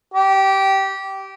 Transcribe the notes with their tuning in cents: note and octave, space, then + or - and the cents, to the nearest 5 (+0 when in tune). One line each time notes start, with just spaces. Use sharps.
G4 -15